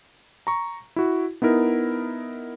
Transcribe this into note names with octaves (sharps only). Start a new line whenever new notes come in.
A#5 C#6
E4 F#4
B3 D#4 E4 A#4